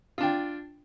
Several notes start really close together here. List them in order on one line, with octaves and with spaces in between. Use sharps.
F4 D4 G5